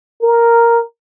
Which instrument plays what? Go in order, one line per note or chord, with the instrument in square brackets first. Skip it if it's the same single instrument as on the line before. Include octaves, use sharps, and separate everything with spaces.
[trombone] A#4